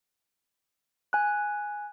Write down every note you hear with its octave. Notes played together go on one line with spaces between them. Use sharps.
G#5 F#6